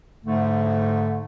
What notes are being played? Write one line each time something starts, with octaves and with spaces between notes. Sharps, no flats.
G#2 D3 A3